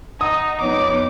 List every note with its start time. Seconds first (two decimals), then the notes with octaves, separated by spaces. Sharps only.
0.21 D#4 F#5 D#6
0.61 F2 B3 D#4 C#5 D6